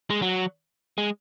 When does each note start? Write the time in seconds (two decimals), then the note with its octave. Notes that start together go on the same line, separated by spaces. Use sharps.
0.10 G#3
0.22 F#3
0.98 G#3